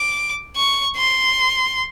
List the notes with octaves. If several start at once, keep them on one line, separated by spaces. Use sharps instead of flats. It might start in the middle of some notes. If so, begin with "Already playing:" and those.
Already playing: D6
C#6
C6